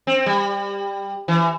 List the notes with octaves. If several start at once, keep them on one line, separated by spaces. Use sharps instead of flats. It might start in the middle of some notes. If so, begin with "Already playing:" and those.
C4
G3
E3